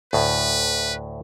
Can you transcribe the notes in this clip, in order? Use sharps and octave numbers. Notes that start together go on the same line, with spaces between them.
D2 A2 B4